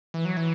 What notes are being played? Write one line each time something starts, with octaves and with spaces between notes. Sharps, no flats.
E3
F#3
E3